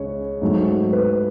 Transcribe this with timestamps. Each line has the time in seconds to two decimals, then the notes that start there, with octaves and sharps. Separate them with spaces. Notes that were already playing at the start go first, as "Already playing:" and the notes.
Already playing: C#2 C#3 C#5
0.42 G#2 F#3 A3
0.93 B4